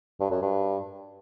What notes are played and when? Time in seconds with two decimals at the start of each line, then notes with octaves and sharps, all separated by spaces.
0.20 G2
0.31 F#2
0.42 G2